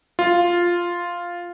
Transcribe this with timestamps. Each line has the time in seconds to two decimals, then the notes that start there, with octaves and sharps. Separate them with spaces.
0.19 F4